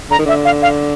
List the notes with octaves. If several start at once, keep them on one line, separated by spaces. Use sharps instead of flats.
D3 A#5
D#3
D3 E5
F5
F5